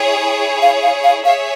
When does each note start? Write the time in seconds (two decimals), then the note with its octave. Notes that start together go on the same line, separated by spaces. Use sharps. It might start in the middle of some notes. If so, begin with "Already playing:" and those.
Already playing: E4 G#4 C#5
0.62 F5
0.83 F5
1.04 F5
1.25 G#4 C#5 E5 F5